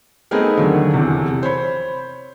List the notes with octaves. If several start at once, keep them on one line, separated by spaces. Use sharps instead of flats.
A3 B3 C4 D#4 G#4 A#4
D#2 D3 F#3
F1 E2 C3
C5 C#5 B5